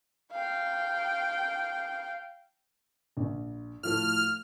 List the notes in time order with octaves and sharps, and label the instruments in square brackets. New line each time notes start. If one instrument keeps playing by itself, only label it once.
[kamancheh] F5 G5
[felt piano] A#1
[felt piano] A2 F3 A3 [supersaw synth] F6